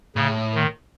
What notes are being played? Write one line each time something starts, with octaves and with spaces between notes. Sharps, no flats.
A2 C#3
D#3